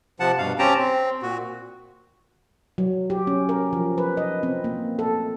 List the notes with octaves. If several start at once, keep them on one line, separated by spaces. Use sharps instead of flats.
C3 F3 F#5 A5
G2 B2 F5
C4 C#4 G4 G5 A5 A#5
C4
A#2 F#4
F#3
G4
C#4
A#4
F3
B4
D#5
C4
A#3
A4